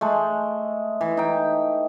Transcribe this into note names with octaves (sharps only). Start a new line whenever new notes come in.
G#3 A3
E3
D#4 G5